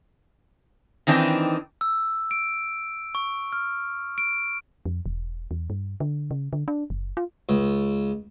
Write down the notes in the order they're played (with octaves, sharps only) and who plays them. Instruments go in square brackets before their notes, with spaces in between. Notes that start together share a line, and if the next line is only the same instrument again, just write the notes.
[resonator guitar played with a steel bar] D#3 E3 C4 D4 D#4
[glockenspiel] E6
D7
C#6
F6
D7
[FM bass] F2
E1
E2
G2
D3
C#3
D3
D4
F#1
F4
[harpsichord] C#2